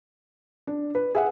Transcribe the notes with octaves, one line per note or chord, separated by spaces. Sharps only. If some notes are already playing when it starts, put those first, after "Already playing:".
D4
B4
G#4 E5 F#5